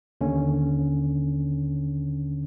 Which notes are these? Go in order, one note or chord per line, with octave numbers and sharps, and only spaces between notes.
D#2 D3 C#4